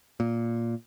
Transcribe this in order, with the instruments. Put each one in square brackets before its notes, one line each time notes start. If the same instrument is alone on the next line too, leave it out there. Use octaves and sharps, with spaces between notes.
[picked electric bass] A#2